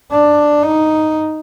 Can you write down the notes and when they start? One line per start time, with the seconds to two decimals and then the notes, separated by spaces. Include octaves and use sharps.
0.11 D4
0.63 D#4